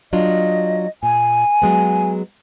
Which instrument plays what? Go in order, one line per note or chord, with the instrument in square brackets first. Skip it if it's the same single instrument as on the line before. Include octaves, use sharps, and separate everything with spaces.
[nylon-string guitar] F#3 D4 F4 [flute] D#5
[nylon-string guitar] A#2 [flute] G#5
[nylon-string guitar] F#3 G#3 B3